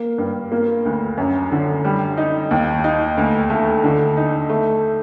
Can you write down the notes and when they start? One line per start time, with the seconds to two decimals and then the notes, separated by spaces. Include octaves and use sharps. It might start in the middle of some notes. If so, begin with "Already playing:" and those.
Already playing: A#3
0.18 G2
0.52 A#3
0.85 D2
1.17 F#2
1.52 D3
1.84 G3
2.17 D#4
2.51 D#2
2.84 D#4
3.17 D2
3.50 A3
3.84 D3
4.17 D#4
4.49 A3